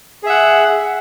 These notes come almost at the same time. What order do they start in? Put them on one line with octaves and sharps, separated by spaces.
G#4 E5 F#5